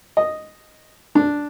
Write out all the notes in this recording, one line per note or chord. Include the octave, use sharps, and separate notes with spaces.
D#5
D4